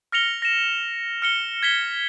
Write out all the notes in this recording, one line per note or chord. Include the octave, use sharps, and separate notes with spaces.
F6 A#6 C#7 F7 G7
A#6 E7
F6 C#7 G7
G#6 B6 G7